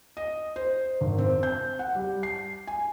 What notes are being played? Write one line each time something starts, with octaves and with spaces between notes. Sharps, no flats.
D#5
C5
G#1
C4
G6
F#5
G3
C7
G#5